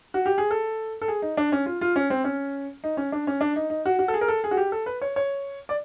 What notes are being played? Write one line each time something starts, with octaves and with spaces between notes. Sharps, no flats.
F#4
G4
G#4
A4
A4
G#4
D#4
D4
C#4
F4
F4
C#4
C4
C#4
D#4
C#4
D4
C#4
D4
D#4
D#4
F#4
F#4
A4
G#4
A#4
A4
G#4
F#4
G4
A4
B4
C#5
C#5
D5